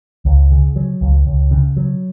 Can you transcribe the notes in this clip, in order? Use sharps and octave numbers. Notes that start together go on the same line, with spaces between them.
C#2
C#3
F#3
C#2
C#2
C#3
F#3